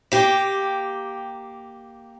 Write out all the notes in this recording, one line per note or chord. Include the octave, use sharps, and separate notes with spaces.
A#3 G4